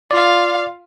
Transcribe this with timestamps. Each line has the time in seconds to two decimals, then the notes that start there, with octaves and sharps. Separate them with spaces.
0.11 F4 D5 F5